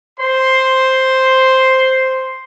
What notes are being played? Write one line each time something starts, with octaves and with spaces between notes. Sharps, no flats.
C5 C6